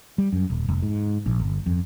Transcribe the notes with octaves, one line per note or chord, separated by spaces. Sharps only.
G3
F#2
D#1
F1
G#2
A#1
G1
F2